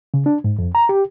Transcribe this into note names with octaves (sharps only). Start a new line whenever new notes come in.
C#3
D4
G#2
F2
A#5
G4